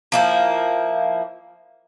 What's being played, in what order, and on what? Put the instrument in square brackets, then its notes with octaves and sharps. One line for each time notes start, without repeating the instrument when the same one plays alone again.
[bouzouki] F3 A#3 E4